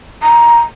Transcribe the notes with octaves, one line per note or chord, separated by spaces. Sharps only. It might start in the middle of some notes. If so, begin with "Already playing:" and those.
A#5